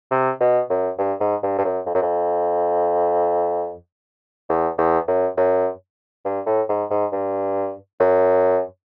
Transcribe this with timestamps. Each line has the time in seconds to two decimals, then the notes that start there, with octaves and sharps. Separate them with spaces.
0.11 C3
0.41 B2
0.70 F#2
0.98 G2
1.20 G#2
1.43 G2
1.59 G2
1.65 F#2
1.86 F2
1.95 F#2
2.02 F2
4.50 E2
4.78 E2
5.08 F#2
5.37 F#2
6.25 G2
6.47 A2
6.69 G#2
6.91 G#2
7.13 G2
8.00 F#2